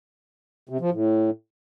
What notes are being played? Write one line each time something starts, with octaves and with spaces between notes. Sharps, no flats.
C3
F3
A2